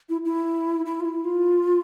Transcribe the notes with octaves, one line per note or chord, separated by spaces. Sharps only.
E4
E4
E4
F4
E4
F4